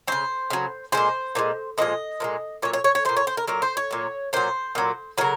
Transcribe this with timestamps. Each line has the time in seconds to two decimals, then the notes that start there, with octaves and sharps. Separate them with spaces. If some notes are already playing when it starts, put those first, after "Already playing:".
0.07 C#3 F#3 C5
0.50 C#3 F#3
0.92 F3 G#3 C5
0.97 A#2
1.35 A#2 F3 G#3
1.78 A#2 F3 G#3 D#5
2.20 A#2 F3 G#3
2.62 A#2 F#3 C#5
2.73 C#5
2.84 C#5
2.95 C#5
3.05 A#2 F#3 C5
3.17 C#5
3.27 C5
3.37 A#4
3.47 A#2 F#3 A#4
3.62 C5
3.77 C#5
3.91 A#2 F#3
4.33 A#2 F#3 C5
4.75 A#2 F#3
5.18 C#3 F#3 A#4